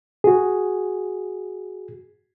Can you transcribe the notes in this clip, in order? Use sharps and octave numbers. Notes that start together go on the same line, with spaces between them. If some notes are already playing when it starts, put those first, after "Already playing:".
F#4 G#4